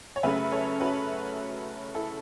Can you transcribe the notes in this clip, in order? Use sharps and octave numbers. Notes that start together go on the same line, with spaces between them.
C#5
F#2 C#3 A3 C#4 B4 E5
A4 C#5
F#4 B4
E4 A4